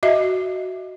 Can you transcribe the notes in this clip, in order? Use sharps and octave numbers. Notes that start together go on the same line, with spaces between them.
F#4 D#5 E5